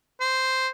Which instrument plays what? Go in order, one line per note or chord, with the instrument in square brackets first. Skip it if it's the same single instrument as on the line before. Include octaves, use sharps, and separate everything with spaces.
[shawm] C5